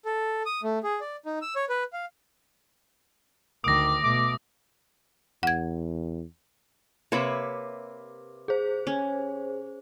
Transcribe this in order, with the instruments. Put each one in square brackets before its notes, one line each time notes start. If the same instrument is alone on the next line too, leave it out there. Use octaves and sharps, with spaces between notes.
[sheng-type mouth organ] A4
D#6
A3
G#4
D5
D#4
E6
C#5
B4
F5
[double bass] D2 D#3 [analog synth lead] D6 [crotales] D#6 A#6
[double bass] B2 A3 [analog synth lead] D6
[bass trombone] E2 [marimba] F#5 G#6
[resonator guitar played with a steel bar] C3 A#3 B4 [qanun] C#5 E5 B5
[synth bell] G#4 C5
[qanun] C#4